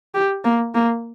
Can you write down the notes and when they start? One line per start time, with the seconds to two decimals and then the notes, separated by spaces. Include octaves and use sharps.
0.15 G4
0.44 A#3
0.75 A#3